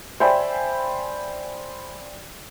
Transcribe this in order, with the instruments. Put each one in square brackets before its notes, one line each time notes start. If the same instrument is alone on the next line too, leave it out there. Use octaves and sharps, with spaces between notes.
[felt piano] C5 D5 E5 G5 G#5 B5